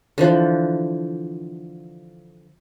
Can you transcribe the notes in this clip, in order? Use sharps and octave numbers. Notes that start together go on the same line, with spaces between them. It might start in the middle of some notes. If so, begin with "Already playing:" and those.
D3 E3 F3